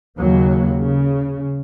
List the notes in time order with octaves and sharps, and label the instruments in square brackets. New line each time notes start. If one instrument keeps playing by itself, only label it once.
[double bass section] D#2 C#3 F#3 A#3
C#3